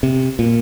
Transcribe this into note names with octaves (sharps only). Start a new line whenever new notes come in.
C3
A#2